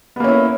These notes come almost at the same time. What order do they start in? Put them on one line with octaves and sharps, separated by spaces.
B3 A#3 C#4 E4